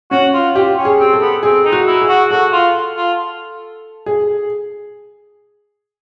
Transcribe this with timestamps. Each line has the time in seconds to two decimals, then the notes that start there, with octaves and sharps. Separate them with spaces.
0.11 C#4 F#4
0.34 F4
0.55 F4 G4
0.77 C#4
0.85 G#4
0.99 C4
1.13 A4
1.21 B3
1.43 C4 G#4
1.64 D#4
1.72 F#4
1.87 E4
2.01 G#4
2.08 F#4
2.30 F#4 A4
2.52 F4
2.96 F4
4.06 G#4